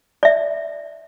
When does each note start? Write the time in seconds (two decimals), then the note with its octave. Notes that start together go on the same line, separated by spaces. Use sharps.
0.23 D5 E5